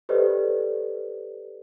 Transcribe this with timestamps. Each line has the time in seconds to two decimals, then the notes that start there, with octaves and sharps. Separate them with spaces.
0.09 G4 A4 B4 C5 D5 D#5